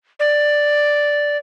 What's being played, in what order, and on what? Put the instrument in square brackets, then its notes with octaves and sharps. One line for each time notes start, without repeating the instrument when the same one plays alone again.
[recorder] D5